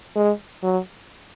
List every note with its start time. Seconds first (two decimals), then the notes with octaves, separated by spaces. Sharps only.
0.16 G#3
0.64 F#3